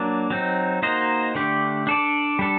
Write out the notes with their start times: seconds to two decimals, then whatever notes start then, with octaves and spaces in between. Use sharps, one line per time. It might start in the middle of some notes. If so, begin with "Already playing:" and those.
Already playing: F#3 A#3 D4
0.30 F#3 C4 D#4
0.83 A#3 D#4 F#4 C5 D#5
1.35 D3 A3 D4 G4
1.87 D4 A4 D5
2.39 G3 D4 A4